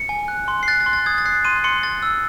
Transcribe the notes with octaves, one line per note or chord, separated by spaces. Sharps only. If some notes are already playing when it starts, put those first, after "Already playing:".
Already playing: C#7
G#5
F#6
C6
C7
F#6 A6
A6
C6
A6
D#6 G#6
A6
F#6 C7
C6 D#7
C6 C#7
C6 A6
E6